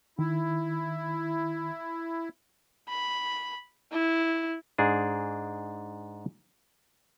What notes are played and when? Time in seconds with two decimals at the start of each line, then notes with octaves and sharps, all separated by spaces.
0.19 D#3 E4
2.89 B5
3.92 E4
4.78 G#2 D4 G#4